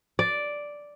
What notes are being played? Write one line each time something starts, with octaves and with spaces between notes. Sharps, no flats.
D5